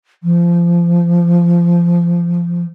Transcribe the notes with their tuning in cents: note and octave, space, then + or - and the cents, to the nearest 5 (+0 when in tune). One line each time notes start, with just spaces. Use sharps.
F3 -20